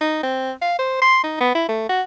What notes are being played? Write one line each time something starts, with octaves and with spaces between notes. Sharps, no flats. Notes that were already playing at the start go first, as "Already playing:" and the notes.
D#4
C4
F5
C5
C6
D#4
B3
E4
A3
F#4